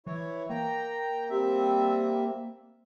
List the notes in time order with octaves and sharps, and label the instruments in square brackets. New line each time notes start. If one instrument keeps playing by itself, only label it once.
[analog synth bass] E3 [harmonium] E4 C#5
[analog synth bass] A#3 [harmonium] G5 A#5
[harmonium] G3 C4 E5